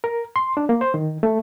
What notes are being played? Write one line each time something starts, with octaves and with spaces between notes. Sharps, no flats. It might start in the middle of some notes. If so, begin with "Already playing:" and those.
A#4
C6
D4
A#3
C5
D#3
A3